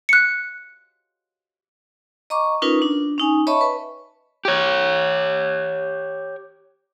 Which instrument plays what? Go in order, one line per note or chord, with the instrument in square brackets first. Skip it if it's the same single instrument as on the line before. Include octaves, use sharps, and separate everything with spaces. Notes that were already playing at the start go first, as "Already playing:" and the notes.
[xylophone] F#6 C#7
[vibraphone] D#5 A#5 C#6 D6
C#4 D#4 F4 A#4 B4
D4
C#4 D#4 G#5
C#5 D#5 E5 A5 B5 C#6
B4
[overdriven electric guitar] G4 C#5